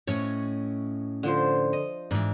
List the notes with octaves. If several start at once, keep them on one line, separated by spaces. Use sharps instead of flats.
A2 C#4 C#5 D#5
D3 F3 C5
D#5
G#2 E3 D4